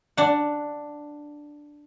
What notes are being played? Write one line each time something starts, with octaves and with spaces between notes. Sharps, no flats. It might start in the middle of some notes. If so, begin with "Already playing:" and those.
D4 F#5